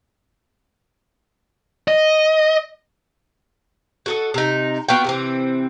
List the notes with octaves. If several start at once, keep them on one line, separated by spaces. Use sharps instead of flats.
D#5
F#4 A4 D#5
C3 D#4
B3 F4 F#4 G5
C3 E3 C4